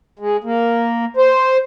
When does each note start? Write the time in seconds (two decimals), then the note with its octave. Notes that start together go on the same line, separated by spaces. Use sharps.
0.19 G#3
0.44 A#3
1.17 C5